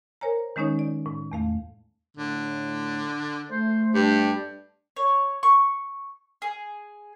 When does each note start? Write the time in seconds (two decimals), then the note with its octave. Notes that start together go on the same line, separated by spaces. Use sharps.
0.21 A#4 C5 C#5 G#5 A#5
0.56 D#3 G#3 C#4 D#4 C#5
0.79 D5
1.06 A2
1.32 E2 A3 F5
2.17 A2 D3
3.51 A3 C5
3.95 G2 D4 G4
4.96 C#5
5.43 C#6
6.42 G#4